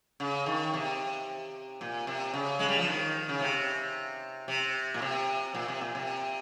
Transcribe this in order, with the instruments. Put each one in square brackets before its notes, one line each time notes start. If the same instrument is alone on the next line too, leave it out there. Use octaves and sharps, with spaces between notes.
[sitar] C#3
D#3
C3
A#2
C3
C#3
G#3
G3
F3
D#3
C#3
C3
C3
A#2
C3
A#2
C3
A#2
C3